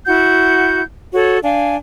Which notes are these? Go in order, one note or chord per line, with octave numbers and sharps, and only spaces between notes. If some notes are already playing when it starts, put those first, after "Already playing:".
E4 F#4 F#5 G6
F#4 A4 C#5
D4 F5 G#5